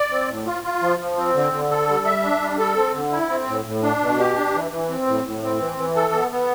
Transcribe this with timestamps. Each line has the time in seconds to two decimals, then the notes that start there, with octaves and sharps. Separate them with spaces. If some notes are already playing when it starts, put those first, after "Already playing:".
Already playing: D5
0.11 C4
0.28 A2
0.46 F4
0.64 F4
0.81 F3
0.99 F3
1.17 C4
1.35 D3
1.52 D3
1.70 A4
1.88 G3
2.06 E5
2.23 D4
2.41 G3
2.59 A4
2.76 C4
2.94 D3
3.12 E4
3.29 C4
3.47 A2
3.65 A2
3.83 D4
4.00 B2
4.19 G4
4.36 D4
4.54 E3
4.71 E3
4.89 C4
5.07 A2
5.25 A2
5.42 C4
5.60 E3
5.78 E3
5.96 A4
6.13 B3
6.31 B3